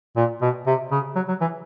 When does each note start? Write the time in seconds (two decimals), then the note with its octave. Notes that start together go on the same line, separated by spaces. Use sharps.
0.17 A#2
0.42 B2
0.66 C3
0.91 C#3
1.16 F#3
1.28 F#3
1.41 E3